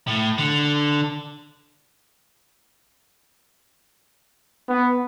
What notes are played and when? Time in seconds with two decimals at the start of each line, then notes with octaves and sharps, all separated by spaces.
0.07 A2
0.38 D3
4.69 B3